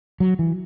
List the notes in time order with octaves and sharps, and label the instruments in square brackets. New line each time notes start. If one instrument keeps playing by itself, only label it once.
[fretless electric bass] F#3
E3